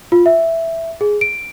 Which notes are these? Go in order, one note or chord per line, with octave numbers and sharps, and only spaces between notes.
F4
E5
G#4
D7